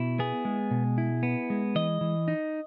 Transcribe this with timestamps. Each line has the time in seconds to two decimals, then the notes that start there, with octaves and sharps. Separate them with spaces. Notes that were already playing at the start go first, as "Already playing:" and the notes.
Already playing: B2 E4
0.19 B3 G#4
0.45 G#3
0.71 B2
0.98 E4
1.23 B3
1.50 G#3
1.75 E3 D#5
2.01 E3
2.28 D#4